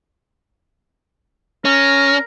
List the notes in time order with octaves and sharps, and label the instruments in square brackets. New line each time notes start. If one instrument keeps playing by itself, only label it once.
[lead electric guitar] C#4 [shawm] A#4